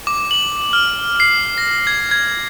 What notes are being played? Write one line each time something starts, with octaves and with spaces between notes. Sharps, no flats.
D6
F#7
F6
C7
A#6
G#6
G#6